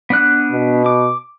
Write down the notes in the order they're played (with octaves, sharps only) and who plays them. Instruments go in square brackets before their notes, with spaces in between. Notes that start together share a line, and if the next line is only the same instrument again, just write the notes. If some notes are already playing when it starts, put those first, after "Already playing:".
[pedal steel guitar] B3 D4 F#6
[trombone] B2
[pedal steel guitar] D6